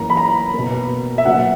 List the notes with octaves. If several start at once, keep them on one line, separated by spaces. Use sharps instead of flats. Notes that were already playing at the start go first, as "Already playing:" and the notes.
Already playing: F#2 E3 A#3 A#5
B5
A#5
B2 A#3
E5
B2 F#3 A#3 F#5